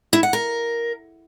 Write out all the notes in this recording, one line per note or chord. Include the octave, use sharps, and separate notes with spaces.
E4
F#5
A#4